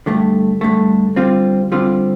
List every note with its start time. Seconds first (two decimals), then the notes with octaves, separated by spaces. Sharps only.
0.06 G2 D3 A3
0.61 G2 D3 A3
1.16 D3 G3 C4 F4
1.72 D3 G3 C4 F4